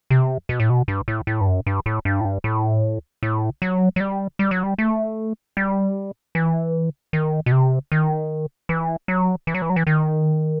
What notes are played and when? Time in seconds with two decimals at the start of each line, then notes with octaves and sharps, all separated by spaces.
0.10 C3
0.49 B2
0.60 A2
0.70 B2
0.88 G2
1.08 A2
1.27 A2
1.41 G2
1.47 F#2
1.67 G2
1.86 A2
2.05 G2
2.21 A2
2.25 G2
2.44 A2
3.23 A2
3.62 F#3
3.96 F#3
4.00 G3
4.39 G3
4.51 F#3
4.63 G3
4.78 A3
5.57 G3
6.35 E3
7.13 D#3
7.46 B2
7.52 C3
7.92 D#3
8.69 E3
9.08 F#3
9.47 E3
9.54 F#3
9.62 E3
9.70 F#3
9.76 E3
9.87 D#3